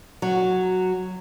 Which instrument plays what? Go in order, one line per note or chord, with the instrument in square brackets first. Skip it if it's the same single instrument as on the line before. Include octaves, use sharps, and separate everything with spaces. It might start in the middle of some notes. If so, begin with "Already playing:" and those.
[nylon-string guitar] F#3